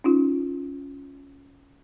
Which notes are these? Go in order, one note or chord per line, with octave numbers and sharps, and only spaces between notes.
C#4 D#4 F4